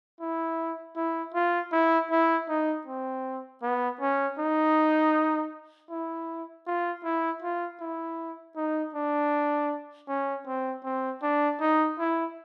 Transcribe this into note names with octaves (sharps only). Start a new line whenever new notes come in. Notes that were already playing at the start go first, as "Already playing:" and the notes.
E4
E4
F4
E4
E4
D#4
C4
B3
C#4
D#4
E4
F4
E4
F4
E4
D#4
D4
C#4
C4
C4
D4
D#4
E4